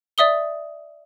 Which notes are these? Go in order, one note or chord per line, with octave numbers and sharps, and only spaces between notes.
D5 E5 D#6 G7